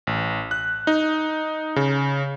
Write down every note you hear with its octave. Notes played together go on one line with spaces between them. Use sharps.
A1
F#6
D#4
C#3